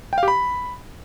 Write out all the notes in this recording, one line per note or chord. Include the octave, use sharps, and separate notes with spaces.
G5
F5
G4
B5